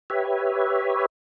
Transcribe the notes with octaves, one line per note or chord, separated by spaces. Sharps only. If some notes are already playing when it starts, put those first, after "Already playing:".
G4 B4 C#5 E5